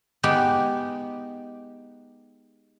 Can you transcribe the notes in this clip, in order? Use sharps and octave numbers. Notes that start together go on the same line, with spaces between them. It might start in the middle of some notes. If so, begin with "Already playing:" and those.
G#3 B3 D#4 G4